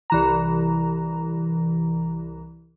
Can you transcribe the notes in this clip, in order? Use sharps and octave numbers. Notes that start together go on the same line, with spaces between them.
C2 E3 A#5